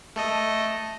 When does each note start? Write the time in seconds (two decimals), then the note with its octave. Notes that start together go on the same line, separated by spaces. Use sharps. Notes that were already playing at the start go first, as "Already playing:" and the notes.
0.16 A3 A4 D#5